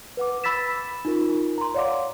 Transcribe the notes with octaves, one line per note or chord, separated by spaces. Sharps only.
B4 F#5 D6
B5 E6 A6 B6 E7
D#4 F4 A#4
A#5 C6
C#5 D5 F5 F#5 D6